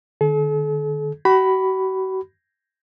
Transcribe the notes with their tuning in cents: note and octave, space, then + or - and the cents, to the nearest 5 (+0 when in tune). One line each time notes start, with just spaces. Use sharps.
D3 +45 A4 -45
F#4 +40 B5 +5